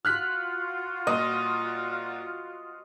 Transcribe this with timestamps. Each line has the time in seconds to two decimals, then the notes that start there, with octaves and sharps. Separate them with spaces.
0.05 F4 F#4 F6 F#6 B6
1.07 A#2 D#5